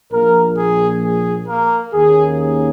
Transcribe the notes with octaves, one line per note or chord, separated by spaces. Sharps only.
A#1 A#2 F3 A#3 A#4
G#4
G#4
A#3 A#4
D#2 D#3 A#3 C#4 G#4
G#4